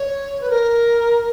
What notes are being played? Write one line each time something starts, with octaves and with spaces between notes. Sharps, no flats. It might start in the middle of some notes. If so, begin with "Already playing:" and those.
Already playing: C#5
B4
A#4